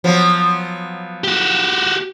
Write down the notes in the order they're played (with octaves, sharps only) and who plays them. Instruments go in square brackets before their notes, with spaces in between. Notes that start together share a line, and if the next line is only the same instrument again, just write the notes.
[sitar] F3 F#3 B3
[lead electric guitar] F#4 G4